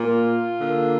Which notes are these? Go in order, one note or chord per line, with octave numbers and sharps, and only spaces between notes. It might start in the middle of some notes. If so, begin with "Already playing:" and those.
Already playing: A#2 A#3 F4
D3 A#3